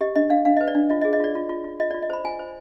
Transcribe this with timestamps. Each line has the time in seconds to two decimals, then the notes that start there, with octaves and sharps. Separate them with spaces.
0.01 G4 D#5
0.16 D4 D#5
0.30 D4 F5
0.45 D4 F5
0.57 D#5
0.61 B4
0.68 D5
0.75 D4
0.90 F4 D#5
1.02 D#5
1.05 G#4
1.13 D#5
1.20 F4 D5
1.35 F4
1.49 F4
1.64 F4
1.80 F4 D#5
1.91 D5
1.94 F4
2.03 D#5
2.10 C5 B5
2.24 F4 G#5
2.39 C5